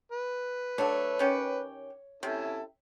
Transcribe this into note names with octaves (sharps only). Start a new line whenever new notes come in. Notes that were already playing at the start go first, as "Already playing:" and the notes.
B4
F#3 A3 D4 C#5
D#3 C#4 G4
C3 C#4 E4 A4